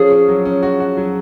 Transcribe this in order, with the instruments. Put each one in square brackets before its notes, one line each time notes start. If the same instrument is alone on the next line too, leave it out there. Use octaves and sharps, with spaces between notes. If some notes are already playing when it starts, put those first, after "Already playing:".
Already playing: [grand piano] F3 C#4 [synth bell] G#4
[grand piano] C#4
F#3
C#4
F#4
F#4
F#3